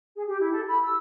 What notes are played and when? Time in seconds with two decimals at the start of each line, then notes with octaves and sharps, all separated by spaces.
0.15 G#4
0.27 G4
0.39 E4
0.51 A4
0.67 B5
0.83 E6